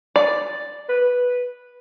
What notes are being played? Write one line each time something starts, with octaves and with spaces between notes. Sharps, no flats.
D5
B4